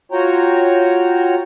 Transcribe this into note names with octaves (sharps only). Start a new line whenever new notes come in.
F4 F#4 C#5 G5 A#5